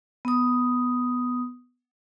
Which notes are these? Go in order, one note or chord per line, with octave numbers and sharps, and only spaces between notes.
B3 D#6